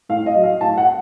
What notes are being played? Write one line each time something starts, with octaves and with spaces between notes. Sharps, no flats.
A2 F5
D#5
F#3
F5
A2 A5
F#5